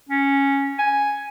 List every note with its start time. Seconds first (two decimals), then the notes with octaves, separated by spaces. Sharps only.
0.09 C#4
0.79 G#5